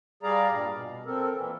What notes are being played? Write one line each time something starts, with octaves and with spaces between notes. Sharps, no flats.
G3 G#4 D5 F5 A#5
G2 A#2
B2
C4 A4 A#4
A#2 E3